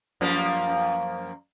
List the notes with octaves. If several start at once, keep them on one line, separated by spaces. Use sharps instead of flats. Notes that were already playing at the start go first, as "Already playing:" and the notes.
F#2 F3 A#3